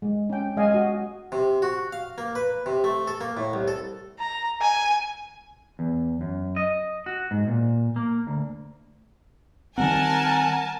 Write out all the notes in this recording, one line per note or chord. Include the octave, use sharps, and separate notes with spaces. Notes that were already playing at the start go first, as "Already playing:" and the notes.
G#3
C#4 G5
G#3 D#5 F5 G#5
F#4 D#5
C3
F#4
F5
A#3
B4
C3
A3
A4
A#3
A2
C2
A4
A#5
G#5
E2
F#2
D#5
F#4
G#2
A#2
A#3
D2
D#3 G3 C4 A#4 F#5 G#5 A5